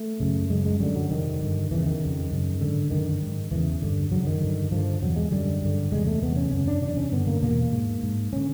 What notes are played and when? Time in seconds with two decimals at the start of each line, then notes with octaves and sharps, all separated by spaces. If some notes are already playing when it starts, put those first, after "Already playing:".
Already playing: A3
0.20 F#2 C#3
0.50 F#2 C#3 G#3
0.66 G#3
0.80 F#2 D3 G3
0.95 F#3
1.11 F2 C3 D#3
1.41 G2 D3
1.71 E2 C#3 E3
1.86 D#3
2.01 F2 C#3
2.31 F#2 C#3
2.60 G#2 D3
2.91 F#2 D3 D#3
3.22 G#2
3.51 E2 C#3 E3
3.82 G2 D3
4.11 F#2 C#3 F#3
4.26 D#3
4.41 G2 D3
4.71 G2 D3 F3
5.02 E2 C3 F#3
5.16 G#3
5.31 F#2 D3 G3
5.62 G2 D3
5.92 E2 C3 G#3
6.07 A3
6.22 E2 C3 B3
6.36 C#4
6.51 F#2 C#3 C#4
6.67 D4
6.81 E2 C3 D4
6.97 C#4
7.12 G2 D3 B3
7.27 A#3
7.42 E2 B2 A#3
7.72 G#2
8.03 G#2
8.33 D3 C#4